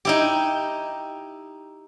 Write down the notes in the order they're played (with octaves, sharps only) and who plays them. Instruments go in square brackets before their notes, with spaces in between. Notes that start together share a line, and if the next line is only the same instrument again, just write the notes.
[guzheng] D#4 E4 G4